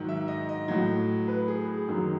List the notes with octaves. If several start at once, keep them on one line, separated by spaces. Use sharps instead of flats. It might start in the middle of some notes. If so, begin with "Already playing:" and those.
Already playing: G#2 D#3 F#3
E5
D#5
D#5
A2 F#3
B4
G#4
G#4
F#2 D#3 F#3